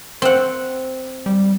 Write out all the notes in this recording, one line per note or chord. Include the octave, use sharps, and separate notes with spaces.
C4 F#5
G3